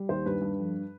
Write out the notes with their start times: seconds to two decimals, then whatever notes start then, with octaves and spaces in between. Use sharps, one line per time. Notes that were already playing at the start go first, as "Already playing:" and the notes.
Already playing: G3
0.09 D#2 C5
0.26 G2 B4
0.41 G2
0.59 F2